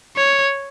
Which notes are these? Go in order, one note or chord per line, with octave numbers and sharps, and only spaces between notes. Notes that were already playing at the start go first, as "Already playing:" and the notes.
C#5